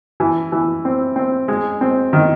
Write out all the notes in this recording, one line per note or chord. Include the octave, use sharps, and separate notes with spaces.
E3
E3
C4
C4
G#3
C4
D#3